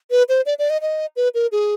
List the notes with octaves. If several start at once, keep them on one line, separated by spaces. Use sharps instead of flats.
B4
C5
D5
D5
D#5
D#5
B4
A#4
G#4